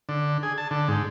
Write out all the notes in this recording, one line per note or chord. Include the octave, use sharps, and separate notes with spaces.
D3
G#4
A5
D3
G#2